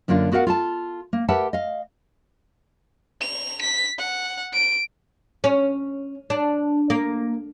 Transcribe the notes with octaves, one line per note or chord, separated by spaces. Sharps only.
F#2 D3 A#3 D4 F4
B3 F#4 A#4 C#5 F5 F#5
F4 A4 A5
A#3
G4 A#4 B4 E5 F#5 A5
D#5 F5
F7
B6
F#5
D7
C#4
D4
A#3